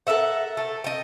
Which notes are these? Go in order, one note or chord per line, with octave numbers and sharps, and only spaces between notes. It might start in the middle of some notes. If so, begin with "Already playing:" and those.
A4 A#4 E5 F#5
A3
D#5 G5